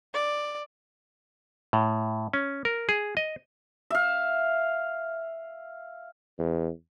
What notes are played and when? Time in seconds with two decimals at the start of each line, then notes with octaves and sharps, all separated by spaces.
0.14 D5
1.73 A2
2.33 C#4
2.65 A#4
2.89 G#4
3.17 D#5
3.91 E5 F5
6.39 E2